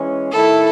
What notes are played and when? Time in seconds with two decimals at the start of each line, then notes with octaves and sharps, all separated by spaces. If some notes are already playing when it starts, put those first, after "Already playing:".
Already playing: E3 G#3 C#4
0.32 D#3 A3 E4 A4